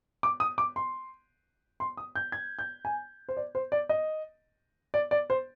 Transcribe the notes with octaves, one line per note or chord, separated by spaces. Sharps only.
D6
D#6
D6
C6
C6
D#6
G6
G#6
G6
G#5
C5
D5
C5
D5
D#5
D5
D5
C5